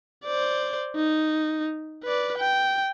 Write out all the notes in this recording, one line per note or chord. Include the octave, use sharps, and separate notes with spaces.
C5 D5
D#4
B4 D5
G5